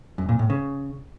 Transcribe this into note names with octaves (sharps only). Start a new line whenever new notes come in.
F#2
A#2
A2
C#3